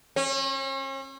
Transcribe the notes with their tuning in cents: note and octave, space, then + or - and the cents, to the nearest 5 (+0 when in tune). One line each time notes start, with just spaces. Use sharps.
C#4 -40